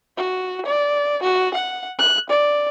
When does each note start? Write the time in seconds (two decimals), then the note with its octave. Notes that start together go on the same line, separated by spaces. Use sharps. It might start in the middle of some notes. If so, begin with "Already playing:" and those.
0.17 F#4
0.66 D5
1.23 F#4
1.54 F#5
1.99 F#6
2.29 D5